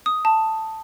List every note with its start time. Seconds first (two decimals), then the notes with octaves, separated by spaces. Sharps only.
0.06 D#6
0.25 A5